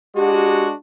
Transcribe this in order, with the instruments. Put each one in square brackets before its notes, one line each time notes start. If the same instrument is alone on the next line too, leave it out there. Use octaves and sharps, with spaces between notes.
[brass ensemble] G#3 D4 F#4 [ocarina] G4